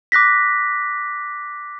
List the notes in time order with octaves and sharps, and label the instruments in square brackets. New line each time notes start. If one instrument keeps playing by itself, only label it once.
[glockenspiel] D6 F#6 A#6 B6